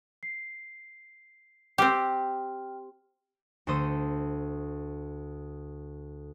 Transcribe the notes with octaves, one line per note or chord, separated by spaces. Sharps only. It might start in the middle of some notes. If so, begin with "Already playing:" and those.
C7
C4 G4 G5 F6
D2 A3 A4 C5 D#6